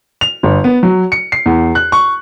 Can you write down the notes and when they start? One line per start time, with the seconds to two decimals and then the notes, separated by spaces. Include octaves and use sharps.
0.21 F7
0.43 G1
0.64 B3
0.83 F#3
1.12 C#7
1.32 C7
1.46 E2
1.75 F#6
1.92 C#6